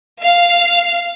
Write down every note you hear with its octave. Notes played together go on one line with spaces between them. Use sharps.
F5